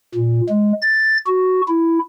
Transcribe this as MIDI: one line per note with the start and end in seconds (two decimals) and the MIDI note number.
0.15 0.41 46
0.50 0.73 56
0.82 1.18 93
1.27 1.61 66
1.68 1.99 64